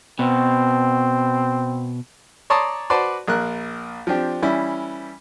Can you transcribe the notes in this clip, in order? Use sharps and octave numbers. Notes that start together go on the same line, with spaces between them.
B2 C4
C#5 D5 A5 A#5 C6 D#6
F#4 B4 C5 D5 A5
A#1 A#4 F#6
F3 C4 D4 G4
E3 G3 C#4 E4